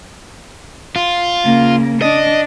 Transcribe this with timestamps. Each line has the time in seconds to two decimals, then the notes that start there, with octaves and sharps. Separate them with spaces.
0.96 F4
1.44 C#3 A#3
2.02 D4 D#5